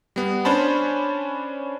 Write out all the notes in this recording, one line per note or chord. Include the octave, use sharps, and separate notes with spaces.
G3 B3
C#4 D4 C5 A5 B5